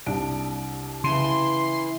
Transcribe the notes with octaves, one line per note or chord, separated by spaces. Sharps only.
C2 D4 D7
C#3 E3 E4 C6